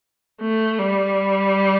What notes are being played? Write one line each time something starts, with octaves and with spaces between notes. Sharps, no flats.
A3
G3